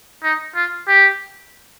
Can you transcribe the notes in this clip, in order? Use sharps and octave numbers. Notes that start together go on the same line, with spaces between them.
D#4
F4
G4